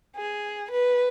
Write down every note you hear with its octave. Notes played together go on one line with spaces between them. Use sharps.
G#4
B4